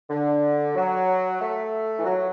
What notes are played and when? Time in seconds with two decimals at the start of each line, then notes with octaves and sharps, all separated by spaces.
0.09 D3
0.75 F#3
1.40 A3
1.99 E3
2.05 F#3